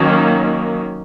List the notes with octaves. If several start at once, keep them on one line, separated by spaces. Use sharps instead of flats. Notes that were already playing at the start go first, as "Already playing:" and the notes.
Already playing: D#3 F#3 A#3 C#4